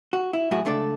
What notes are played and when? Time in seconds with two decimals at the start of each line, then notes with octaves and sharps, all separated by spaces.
0.13 F#4
0.33 E4
0.51 F#2 A2 E4 F#4 G#4
0.65 C#2 A3 D4 A4 D5